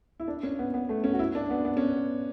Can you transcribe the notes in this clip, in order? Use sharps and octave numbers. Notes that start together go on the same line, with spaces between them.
E4
D4
C#4
B3
B3
A3
C#4
F#4
E4
D4
B3
B3
C#4